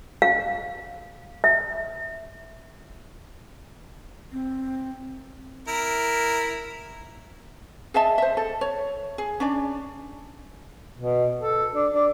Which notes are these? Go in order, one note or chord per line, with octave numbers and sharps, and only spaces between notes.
F5
E5
C4
E4 A#4
G#4 D#5 E5 A5
C5 E5
A4
C#5
G#4
C#4 D4 D5
B2
A4
D4
D4